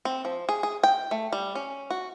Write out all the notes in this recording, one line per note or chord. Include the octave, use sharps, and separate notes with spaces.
C4
F3
G#4
G#4
G5
A3
G3
C#4
F#4